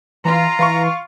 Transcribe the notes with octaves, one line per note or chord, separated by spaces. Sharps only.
E3 F4 A#5
E3 F5 C6 C#6